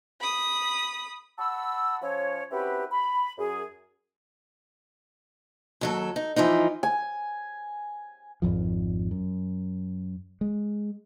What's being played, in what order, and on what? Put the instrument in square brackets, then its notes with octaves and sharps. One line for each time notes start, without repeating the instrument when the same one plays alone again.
[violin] B5 D#6
[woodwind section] F#5 A5 B5 C#6 E6
F3 C#4 C#5
C4 C#4 E4 F#4 G4 B4
B5
F#2 G#4
[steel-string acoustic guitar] D#2 F#3 A4
D#4
E3 F3 A#3 D#4
[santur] G#5
[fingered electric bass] G#1 F2 F3
F#2
G#3